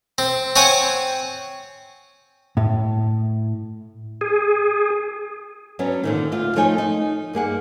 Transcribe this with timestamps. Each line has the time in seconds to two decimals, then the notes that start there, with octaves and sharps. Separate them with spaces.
0.18 C4
0.56 C4 C#5 F#5 G#5
2.57 A2
4.21 G#4
5.79 F#3 B3 C#4 D4
6.03 A#2 D3 D#3
6.32 D2 F4
6.56 F3 A3 D#4 F4 C#5 G#5
6.78 D#4
7.33 G2 A#3 G#4 F#5